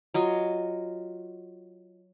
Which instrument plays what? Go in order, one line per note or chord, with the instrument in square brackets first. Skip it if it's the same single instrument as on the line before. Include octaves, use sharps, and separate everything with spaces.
[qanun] F#3 F4 D#5